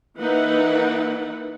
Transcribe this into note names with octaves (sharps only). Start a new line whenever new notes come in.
E3 A#3 D#4 E4 B4 F#5